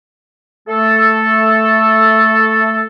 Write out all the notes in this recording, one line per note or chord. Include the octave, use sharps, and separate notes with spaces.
A3 A4